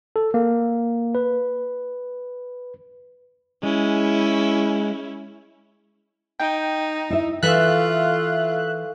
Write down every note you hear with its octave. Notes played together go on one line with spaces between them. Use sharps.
A4
A#3
B4
G#3 C#4 E4
D#4 G5
E4 E5
E3 F4 A4 E5 F5 C#6 F#6